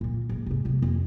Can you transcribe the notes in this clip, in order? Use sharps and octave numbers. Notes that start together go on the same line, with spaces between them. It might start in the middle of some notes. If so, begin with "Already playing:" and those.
A#2 D3
D#2 G#2
G#2 C3
C3 G3
F2 E4